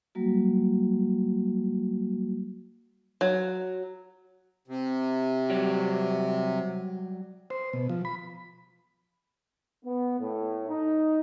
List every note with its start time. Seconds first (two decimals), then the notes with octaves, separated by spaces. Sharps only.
0.15 F#3 G3 A#3 F#4
3.21 F#3
4.68 C3
5.50 F#3 G3
7.50 C5
7.73 B2
7.89 F3
8.05 B5
9.85 B3
10.20 A2
10.68 D#4